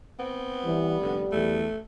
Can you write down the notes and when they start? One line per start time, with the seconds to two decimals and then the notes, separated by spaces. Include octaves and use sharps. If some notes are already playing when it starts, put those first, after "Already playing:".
0.19 B3 C4
0.65 E3 G3
1.01 F1 D3
1.32 E2 A3